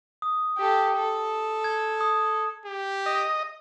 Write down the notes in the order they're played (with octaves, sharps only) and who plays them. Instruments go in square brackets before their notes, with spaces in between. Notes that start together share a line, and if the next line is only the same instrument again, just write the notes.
[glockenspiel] D#6
[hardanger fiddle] G4 A4
A4
[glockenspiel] G#6
D#6
[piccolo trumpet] G4
[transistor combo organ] D#5